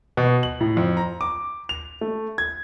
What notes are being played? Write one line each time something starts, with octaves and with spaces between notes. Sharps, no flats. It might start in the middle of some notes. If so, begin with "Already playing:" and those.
B2
F#7
A2
F2
A#5
D6
F7
A3
G#6